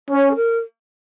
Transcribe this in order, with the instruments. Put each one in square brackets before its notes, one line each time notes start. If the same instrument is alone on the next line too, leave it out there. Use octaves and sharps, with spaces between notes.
[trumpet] C#4 [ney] C#5
[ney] A4
A#4